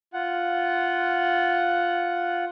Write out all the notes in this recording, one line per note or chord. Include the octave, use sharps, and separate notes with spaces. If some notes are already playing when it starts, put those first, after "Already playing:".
F4 F#5